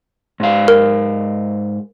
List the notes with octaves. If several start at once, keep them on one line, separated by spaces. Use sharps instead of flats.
G#2 F5
A#4